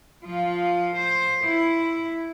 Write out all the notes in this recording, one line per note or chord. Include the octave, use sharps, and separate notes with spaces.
F3 F4
C5
E4